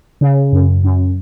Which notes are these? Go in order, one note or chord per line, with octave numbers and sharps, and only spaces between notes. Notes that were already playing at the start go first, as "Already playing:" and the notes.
C#3
F#2
F#2